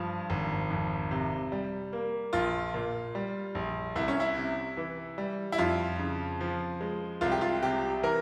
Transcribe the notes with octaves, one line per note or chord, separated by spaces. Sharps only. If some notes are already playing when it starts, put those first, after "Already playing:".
Already playing: G2 F3
G#1
F2
C3
G3
A#3
A#1 F4
A#2
G3
A#1
C2 E4
C#4
E4
C3
E3
G3
E4
F2 F4
C#3
F3
G#3
C2 F4
G4
F4
C3 G4
E3 A#4